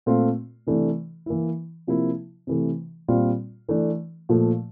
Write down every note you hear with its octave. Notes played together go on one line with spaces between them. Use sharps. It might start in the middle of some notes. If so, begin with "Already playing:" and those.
A#2 A3 C4 F4
C3 E3 A3 D4
E3 A#3 E4
C3 F3 A#3 E4
C3 E3 A3
A#2 G3 C4 F4
E3 A3 D4
A#2 F3 A3